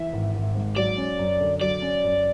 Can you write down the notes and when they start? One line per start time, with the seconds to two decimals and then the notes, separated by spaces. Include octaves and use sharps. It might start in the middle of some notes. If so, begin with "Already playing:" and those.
Already playing: E3 E5
0.13 G#1
0.34 G#1
0.55 G#2
0.76 F#3 D5
0.98 C#4
1.19 F#2
1.40 D3
1.61 F#3 D5
1.82 C#4
2.04 F#2